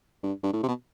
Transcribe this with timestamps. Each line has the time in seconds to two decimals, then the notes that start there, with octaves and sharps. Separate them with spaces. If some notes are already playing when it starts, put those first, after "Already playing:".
0.23 G2
0.43 G2
0.53 A2
0.63 C3
0.68 B2